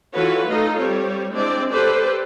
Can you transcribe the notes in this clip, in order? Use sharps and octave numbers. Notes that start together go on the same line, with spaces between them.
E3 F4 F#4 A4 B4 C#5
A3 D#4 F4 A4 D#5
G3 C4 C#5
G#3 C4 D4 E4 D5
G4 A4 B4 C5 D5